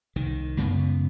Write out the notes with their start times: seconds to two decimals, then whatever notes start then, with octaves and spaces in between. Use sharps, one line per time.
0.16 C2 D#3
0.57 C#2 F#2 C#3 B3